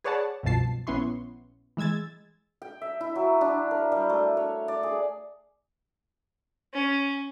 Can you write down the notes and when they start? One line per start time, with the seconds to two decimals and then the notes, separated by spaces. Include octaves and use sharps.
0.04 G#4 B4 C#5 D5 F#5 A5
0.43 C2 F#2 B2 F3 A5 C7
0.87 A#1 B3 C#4 E4 C6 C#6
1.77 E3 G#3 E6 G#6 A6
2.62 G5
2.81 E5
3.01 E4
3.15 F#3
3.41 D4
3.71 A#4
3.92 G3
4.09 A3
4.37 C#5
4.68 D5
4.83 G#4
6.74 C#4